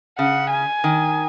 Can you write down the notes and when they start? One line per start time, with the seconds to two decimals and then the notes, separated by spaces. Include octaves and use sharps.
0.19 C#3 F#5
0.51 G#5
0.84 D#3